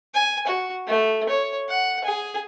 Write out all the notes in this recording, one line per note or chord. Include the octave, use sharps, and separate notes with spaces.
G#5
F#4
A3
C#5
F#5
G#4